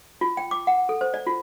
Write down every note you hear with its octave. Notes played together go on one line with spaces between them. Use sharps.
F4
G5
D6
F#5
A4
C5
D5
F4